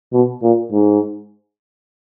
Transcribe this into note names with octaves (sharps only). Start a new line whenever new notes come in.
B2
A#2
G#2